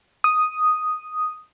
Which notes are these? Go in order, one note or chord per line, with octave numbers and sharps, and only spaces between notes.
D#6